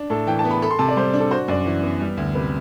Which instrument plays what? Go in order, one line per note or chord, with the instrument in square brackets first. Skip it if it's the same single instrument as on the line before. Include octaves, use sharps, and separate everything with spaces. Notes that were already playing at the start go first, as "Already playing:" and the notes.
Already playing: [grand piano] D4
[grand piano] A2 [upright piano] A4
[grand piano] E3 [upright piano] G5
[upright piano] A5
[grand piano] B3
[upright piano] B5
[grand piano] A4 [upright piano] B5
[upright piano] C6
[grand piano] C3 [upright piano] A5
[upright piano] D5
[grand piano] G3 [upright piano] C5
[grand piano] D4
[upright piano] A4
[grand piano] F#4 [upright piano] C5
[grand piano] F#2 [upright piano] D5
[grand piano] E3
B3
G3
D2
[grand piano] C3 [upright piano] B4